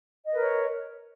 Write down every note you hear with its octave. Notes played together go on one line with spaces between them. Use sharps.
A#4 B4 C#5 D#5